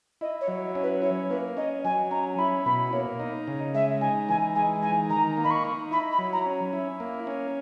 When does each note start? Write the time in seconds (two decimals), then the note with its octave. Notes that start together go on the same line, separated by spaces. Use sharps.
0.21 E4 D#5
0.41 C#5
0.48 F#3
0.75 C#4
0.83 B4
1.02 E4 C#5
1.30 A#3 B4
1.57 C#4 D#5
1.84 F#3 G#5
2.11 C#4 A#5
2.38 E4 B5
2.66 B2 B5
2.92 A#3 C#5
3.20 D#4
3.47 C#3
3.74 G#3 E5
4.01 D#4 G#5
4.29 E3 G#5
4.55 G#3 G#5
4.82 D#4 G#5
5.10 D#3 A#5
5.37 A#3
5.44 B5
5.50 C#6
5.65 D#4
5.91 E4 B5
6.12 B5
6.19 F#3
6.33 A#5
6.46 C#4
6.73 E4
7.00 A#3
7.27 C#4